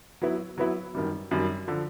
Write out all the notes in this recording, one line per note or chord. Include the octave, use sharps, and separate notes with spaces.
F#3 B3 E4
F#3 B3 E4
F#2 D#3 G3
F#2 D#3 G3
D3 F3